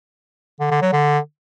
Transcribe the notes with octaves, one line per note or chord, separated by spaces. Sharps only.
D3
D3
F#3
D3